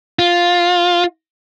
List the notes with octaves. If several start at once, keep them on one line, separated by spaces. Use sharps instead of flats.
F4